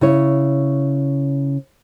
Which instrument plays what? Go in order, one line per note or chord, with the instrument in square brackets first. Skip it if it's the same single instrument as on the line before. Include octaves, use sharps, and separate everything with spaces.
[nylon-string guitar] C#3 E4 C#5